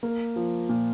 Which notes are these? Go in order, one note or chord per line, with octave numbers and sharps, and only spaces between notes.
A#3
F3
A#2